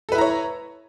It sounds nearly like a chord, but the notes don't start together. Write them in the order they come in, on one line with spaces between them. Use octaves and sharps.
A4 B4 E4 A#5 C#5